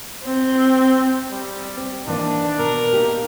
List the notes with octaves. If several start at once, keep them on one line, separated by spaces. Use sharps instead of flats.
C4
G3
C4
D#3 E3 A#3 D4
B2 A#4
A#3 D#4 G4